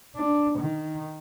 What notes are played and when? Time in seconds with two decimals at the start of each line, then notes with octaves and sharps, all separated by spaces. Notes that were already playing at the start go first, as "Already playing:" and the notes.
0.16 D4
0.59 D#3